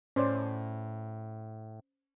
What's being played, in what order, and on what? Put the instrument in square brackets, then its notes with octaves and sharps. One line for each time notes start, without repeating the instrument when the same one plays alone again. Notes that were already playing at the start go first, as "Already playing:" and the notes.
[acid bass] A2 [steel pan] C#4 C5 D5